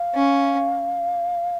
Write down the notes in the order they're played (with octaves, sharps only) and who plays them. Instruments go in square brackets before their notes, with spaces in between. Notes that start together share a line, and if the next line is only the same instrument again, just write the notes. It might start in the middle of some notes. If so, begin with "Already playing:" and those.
Already playing: [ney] F5
[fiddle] C#4